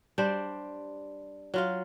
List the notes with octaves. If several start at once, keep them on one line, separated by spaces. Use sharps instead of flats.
G3 D4 C5
F#3 F4 F5